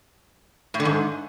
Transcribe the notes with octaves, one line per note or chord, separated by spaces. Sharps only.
A2
D3
G#2